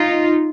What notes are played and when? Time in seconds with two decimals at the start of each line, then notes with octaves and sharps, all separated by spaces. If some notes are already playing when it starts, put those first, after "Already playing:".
Already playing: D#4 F4